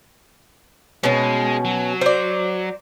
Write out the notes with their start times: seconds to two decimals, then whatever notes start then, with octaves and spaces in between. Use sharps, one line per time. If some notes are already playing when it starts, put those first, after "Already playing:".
1.03 B2 G#3 C#4
1.65 F#3
2.01 C5 D5